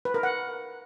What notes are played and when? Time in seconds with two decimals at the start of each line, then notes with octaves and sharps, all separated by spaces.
0.05 B4
0.14 A#4
0.23 F#5